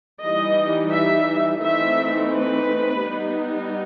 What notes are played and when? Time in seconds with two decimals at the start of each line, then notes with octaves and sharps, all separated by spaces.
0.21 E3 G3 D#4 D#5
0.91 E5
1.61 E3 A3 C4 D#4 E5
2.32 B4
3.01 G3 B3 D#4